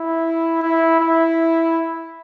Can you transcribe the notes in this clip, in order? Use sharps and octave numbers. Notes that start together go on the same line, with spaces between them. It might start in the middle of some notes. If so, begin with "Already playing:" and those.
Already playing: E4
E4
E4